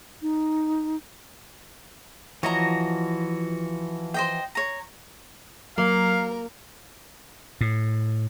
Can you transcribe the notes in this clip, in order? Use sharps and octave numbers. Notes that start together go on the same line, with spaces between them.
D#4
E3 F3 F#4 C#5 D#5 A#5
C5 D#5 G5
C#5 A#5
F#3 A#3 A#4 F5
A2